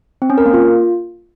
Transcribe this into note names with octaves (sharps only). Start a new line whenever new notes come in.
C4
C#4
A#4
A#3
F4